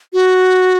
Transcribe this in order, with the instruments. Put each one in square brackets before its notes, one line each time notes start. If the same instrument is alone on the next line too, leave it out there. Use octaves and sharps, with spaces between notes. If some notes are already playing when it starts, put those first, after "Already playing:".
[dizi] F#4